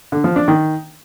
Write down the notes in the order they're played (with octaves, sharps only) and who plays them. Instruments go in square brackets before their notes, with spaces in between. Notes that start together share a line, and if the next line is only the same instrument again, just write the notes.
[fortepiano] D3
F3
D4
D#3